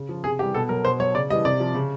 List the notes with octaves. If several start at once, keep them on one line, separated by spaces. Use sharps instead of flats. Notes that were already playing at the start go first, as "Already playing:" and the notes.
Already playing: C#3
F3
C3 G#4
E3 G3 G4
B2 A4
F#3 A#4
B2 C5
F#3 C#5
C#3 D5
E3 G3 D#5
C3 D5
F3
C#3